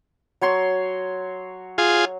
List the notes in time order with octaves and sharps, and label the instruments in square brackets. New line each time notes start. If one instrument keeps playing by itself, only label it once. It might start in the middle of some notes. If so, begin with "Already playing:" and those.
[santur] F#3 C#5 C6
[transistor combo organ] F4 G#4